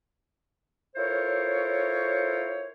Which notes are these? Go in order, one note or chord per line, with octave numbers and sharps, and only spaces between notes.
E4 F4 A4 A#4 C5 C#5